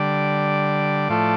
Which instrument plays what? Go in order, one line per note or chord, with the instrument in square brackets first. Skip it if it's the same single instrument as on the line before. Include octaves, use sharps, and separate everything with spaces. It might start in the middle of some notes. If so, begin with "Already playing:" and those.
Already playing: [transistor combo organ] D3 G3 D5
A2 F3 A3